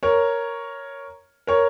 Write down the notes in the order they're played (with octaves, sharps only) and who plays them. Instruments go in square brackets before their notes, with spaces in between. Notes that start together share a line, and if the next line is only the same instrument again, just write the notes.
[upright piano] A#4 C#5
A#4 C#5